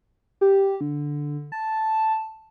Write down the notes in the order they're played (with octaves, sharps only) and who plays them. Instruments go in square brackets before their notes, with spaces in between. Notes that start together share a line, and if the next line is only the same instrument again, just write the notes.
[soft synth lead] G4
D3
A5